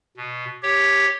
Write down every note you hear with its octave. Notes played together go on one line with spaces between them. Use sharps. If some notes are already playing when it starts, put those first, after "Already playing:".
B2
G4 C#5